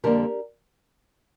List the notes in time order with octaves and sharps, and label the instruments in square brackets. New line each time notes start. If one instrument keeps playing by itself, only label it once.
[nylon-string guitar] F2 D3 G3 A#3 G4 A#4